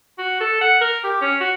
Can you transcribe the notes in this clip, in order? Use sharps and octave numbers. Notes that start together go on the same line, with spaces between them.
F#4
A4
F#5
A#4
G4
C#4
F#4